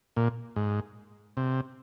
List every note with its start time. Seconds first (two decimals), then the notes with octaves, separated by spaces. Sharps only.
0.17 A#2
0.56 G#2
1.37 C3